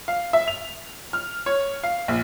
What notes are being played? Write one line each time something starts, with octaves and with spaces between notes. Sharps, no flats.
F5
E5
F7
F6
C#5
F5
A#1